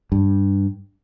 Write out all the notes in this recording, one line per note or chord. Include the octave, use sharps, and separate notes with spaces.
G2